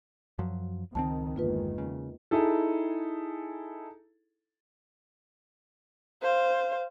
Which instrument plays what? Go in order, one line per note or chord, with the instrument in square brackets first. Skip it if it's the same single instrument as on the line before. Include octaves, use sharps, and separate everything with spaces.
[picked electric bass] F#2 F3 F#3
[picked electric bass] C#2 G#3 C4 [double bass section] D#3 [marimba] A5
[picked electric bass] G1 [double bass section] E2 D#3 G#3 [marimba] A#3 F4 B4
[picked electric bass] C#3
[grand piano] D#4 E4 G#4 A4
[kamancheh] C5 F5